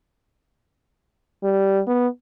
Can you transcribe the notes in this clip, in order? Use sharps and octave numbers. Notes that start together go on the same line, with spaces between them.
G3
B3